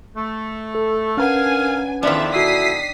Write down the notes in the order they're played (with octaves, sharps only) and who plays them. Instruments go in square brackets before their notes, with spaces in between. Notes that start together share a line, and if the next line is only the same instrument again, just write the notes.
[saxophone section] A3
[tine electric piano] A4
[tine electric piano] C#4 B4 F#5 [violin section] D4 G#5 [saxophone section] A#4 F5
[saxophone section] E2 F3 [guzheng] D#3 D4 [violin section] E5
[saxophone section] B2 D3 E4 [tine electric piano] F#4 E5 [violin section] D#6 B6 C7